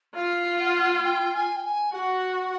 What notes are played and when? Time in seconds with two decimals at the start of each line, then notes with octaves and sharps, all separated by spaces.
0.15 F4 F5
0.60 F#5
1.04 G5
1.34 G#5
1.56 G5
1.64 G#5
1.93 F#4 F#5